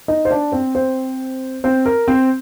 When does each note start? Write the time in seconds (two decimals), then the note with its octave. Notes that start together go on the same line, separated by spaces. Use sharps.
0.08 D#4 D#5
0.25 C5
0.31 D4 D5
0.52 C4 C5
0.75 C4 C5
1.64 C4 C5
1.86 A#4
2.08 C4 C5